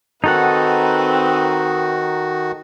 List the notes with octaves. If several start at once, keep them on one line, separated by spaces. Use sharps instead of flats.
D#3 C4 D#4 F#4 A4 B4 F#5